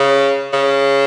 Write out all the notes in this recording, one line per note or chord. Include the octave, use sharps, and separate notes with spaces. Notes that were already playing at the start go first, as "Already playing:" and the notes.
Already playing: C#3
C#3